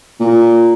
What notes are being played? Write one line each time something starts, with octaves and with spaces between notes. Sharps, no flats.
A#2